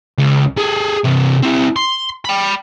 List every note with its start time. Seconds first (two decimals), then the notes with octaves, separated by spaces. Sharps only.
0.18 C#2
0.57 G#4 A4
1.04 C3 E3
1.43 C4 E4
1.76 C6
2.25 G5 B5